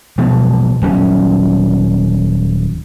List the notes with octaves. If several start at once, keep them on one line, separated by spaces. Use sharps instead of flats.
B2 F3 F#3 G#3
D#1 F#3 C#4